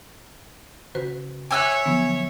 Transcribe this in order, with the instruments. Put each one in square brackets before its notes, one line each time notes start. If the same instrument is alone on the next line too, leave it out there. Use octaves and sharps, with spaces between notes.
[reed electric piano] C#3 [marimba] F#4 B4 C5
[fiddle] C#5 E5 [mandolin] G#5 E6 F#6 [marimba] D6
[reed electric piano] D3 F3 F#3 [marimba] B3